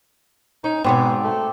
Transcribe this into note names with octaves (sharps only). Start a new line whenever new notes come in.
C#4 D#4
G#2 B2 B3 C4 C#5 D5 E6
A3